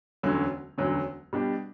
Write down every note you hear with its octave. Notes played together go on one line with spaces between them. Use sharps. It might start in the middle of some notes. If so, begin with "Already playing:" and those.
E1 D2 D3 F#3 C#4
E1 D2 D3 F#3 C#4
B2 G3 D4 G4